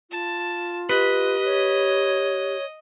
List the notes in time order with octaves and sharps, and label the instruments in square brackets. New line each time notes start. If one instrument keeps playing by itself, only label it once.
[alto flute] F4 [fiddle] A5
[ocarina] G4 [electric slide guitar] B4 [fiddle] D#5
[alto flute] C#5